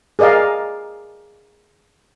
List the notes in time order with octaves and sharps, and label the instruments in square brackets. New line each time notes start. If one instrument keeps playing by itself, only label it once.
[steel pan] G#4 A#4 D5 D#5 F5